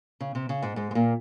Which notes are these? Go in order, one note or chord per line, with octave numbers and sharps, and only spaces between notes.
C#3
C3
C#3
G#2 G#3
G#2 G#3
G#3
A#2 A#3